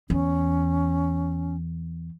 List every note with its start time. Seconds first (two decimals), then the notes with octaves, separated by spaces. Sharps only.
0.10 E2 C#4